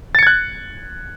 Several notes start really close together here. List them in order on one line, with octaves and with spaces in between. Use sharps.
A6 C#7 G#6 F#6